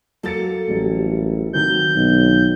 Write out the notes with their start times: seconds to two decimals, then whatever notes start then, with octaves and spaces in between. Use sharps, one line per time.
0.23 F#3 A#3 A4 A6 C#7
0.68 A1 F#3 G3
1.53 D#3 F#3 C4 G6
1.96 B1